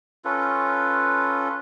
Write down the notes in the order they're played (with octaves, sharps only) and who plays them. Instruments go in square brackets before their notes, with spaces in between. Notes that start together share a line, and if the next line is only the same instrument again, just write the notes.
[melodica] C#4 F4 A4 B4